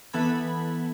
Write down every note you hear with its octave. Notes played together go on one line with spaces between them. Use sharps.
E3 B3 A4 B5 G#6